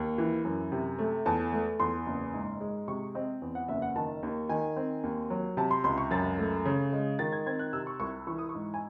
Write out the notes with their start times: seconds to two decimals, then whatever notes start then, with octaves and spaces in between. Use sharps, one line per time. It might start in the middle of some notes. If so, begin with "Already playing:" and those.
Already playing: D#2
0.18 E3
0.45 F#2
0.72 C3
0.99 A3
1.26 E2 A5
1.52 A3
1.80 E2 C6
2.06 F#1
2.34 G#2
2.61 G#3
2.88 C3 C#6
3.15 C4 D#5
3.42 E2
3.55 F#5
3.68 F#1 E5
3.82 F#5
3.96 D#3 A5
4.23 D#2
4.49 D#3 G#5
4.77 C4
5.04 D#2
5.30 F#3
5.57 C3 A5
5.71 C6
5.84 C#2 C6
5.98 C#6
6.11 F#2 A6
6.38 A3
6.65 C#3
6.92 G#3
7.19 D#3 A6
7.32 G#6
7.46 C4 G#6
7.59 F#6
7.73 C3 E6
7.87 C#6
8.00 C2 C#6
8.27 E3 C#6
8.39 D#6
8.49 C#6
8.55 G#2
8.74 G#5